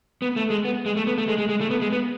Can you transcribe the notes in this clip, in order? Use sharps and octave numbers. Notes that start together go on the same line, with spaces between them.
B3
A3
G#3
B3
G#3
A3
B3
A3
G#3
G#3
G#3
A3
B3
G#3
B3